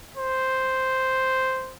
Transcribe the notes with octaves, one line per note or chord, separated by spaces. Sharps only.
C5